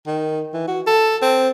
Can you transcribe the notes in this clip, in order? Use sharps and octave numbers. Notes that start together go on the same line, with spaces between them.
D#3
E3
F#4
A4
C4